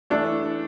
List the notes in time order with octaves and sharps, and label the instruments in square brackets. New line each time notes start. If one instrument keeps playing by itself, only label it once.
[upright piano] E3 A3 D4 A4